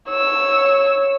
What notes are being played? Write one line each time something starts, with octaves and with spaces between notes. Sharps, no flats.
C#5 E6